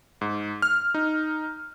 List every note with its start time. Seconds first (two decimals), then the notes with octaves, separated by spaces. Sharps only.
0.21 G#2
0.62 F6
0.94 D#4